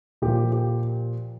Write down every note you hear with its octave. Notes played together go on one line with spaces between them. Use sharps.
A#2 F3 G4
G4